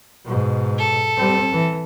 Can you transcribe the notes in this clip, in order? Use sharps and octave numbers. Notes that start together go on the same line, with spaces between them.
G#2 B2
A4
G3 C4
E3